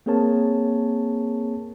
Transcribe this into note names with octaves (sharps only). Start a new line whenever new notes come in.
A#3 C4 G#4 A#4 C#5 A5